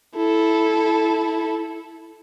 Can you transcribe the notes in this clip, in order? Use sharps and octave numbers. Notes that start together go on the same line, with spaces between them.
E4 A4